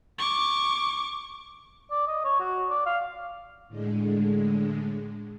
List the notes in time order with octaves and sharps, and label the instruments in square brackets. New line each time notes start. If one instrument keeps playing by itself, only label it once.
[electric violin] C#6 D6
[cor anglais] D5
D#5
C#5
F#4
D5
F5
[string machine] A2 D3 G#3